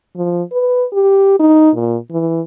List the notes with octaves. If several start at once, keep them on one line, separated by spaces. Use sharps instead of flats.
F3
B4
G4
D#4
A#2
E3